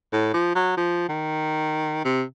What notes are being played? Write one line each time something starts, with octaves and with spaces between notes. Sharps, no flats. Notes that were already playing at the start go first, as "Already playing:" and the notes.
A2
F3
F#3
F3
D#3
C3